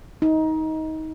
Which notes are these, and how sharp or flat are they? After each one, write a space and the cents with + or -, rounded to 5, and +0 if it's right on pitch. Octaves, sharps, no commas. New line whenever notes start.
D#4 +20